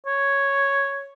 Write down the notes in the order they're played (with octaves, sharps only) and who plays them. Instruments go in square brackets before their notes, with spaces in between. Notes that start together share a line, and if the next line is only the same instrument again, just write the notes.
[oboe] C#5